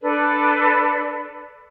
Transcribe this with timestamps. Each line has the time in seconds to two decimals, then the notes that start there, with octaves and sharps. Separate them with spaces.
0.01 D4 A4 B4 D5